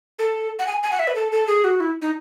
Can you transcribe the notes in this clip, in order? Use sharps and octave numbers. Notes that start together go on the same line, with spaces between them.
A4
F#5
G#5
G#5
F#5
E5
B4
A4
A4
G#4
F#4
E4
D#4